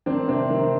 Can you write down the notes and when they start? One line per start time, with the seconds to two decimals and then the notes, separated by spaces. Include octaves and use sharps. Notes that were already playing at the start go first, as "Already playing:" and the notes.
0.06 D#3 C4 D4
0.28 C3 C4 D4
0.50 D#3